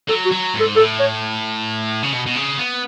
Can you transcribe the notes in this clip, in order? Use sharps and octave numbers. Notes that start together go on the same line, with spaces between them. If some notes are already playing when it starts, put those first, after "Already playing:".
F#3 A4
F#4
F#3
G#2
A4
A2 A4
C#5
C#3
B2
B2
C#3
B3